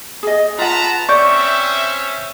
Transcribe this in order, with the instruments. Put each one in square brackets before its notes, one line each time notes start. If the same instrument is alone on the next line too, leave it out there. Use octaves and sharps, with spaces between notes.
[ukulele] G#4 D#5
[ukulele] F4 F#5 [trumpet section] B4 A5 A#5
[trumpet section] C4 C#4 E5 [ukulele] D5 [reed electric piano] C#6 G6